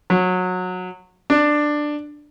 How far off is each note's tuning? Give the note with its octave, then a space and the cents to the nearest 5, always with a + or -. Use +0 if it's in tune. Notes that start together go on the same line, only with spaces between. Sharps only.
F#3 -20
D4 +10